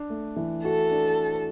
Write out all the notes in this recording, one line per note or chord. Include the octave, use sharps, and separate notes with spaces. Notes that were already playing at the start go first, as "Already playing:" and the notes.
Already playing: D4
A3
E3
F#4 A4
D4